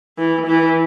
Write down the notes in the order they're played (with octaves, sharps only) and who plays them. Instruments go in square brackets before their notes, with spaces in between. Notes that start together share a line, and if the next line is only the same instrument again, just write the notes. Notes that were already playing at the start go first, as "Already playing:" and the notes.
[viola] E3
E3